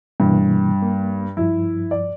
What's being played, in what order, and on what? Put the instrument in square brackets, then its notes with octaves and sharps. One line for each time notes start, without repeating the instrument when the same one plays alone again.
[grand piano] G2 [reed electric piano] B2 E3 A#3
[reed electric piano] A#3
[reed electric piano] G2 F3 [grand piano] E4
[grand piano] D5